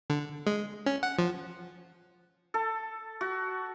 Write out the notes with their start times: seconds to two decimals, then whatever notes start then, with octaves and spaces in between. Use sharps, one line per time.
0.10 D3
0.47 G#3
0.86 C#4
1.03 F#5
1.18 F3
2.54 A4
3.21 F#4